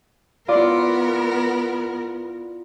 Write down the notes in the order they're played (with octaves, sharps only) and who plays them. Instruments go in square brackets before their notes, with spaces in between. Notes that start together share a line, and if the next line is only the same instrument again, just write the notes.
[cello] B3 A#4 [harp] E4 F4 D5